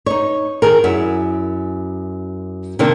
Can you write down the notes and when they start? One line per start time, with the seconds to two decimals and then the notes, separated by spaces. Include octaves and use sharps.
0.06 D#4 C#5
0.62 D#3 G#4 A#4
0.84 F#2 E4 G#4
2.79 C3 D#3 A#3 D4 A#4